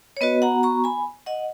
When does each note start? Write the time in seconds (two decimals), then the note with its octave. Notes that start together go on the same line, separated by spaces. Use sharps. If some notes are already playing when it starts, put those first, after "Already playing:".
0.17 C#5
0.21 B3 F#4 B4 D#5
0.42 F#5 A#5
0.63 A#5 C#6
0.84 G#5 B5
1.26 D#5 F#5